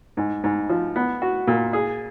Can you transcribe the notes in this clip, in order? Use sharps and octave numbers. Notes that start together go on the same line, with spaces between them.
G#2
G#2
F3
B3
F#4
A#2
G#4